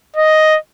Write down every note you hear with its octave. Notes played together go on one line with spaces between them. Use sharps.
D#5